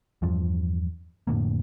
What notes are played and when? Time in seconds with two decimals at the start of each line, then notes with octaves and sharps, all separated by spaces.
0.22 E2 G2 F3
1.27 F2 A2 D3 A#3